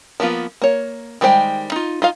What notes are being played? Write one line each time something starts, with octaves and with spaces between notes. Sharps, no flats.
F3 A#3 B3 F4
A#3 C#5
D#3 G3 G#3 C5 G5
D#4 F4
D#4 F4 F5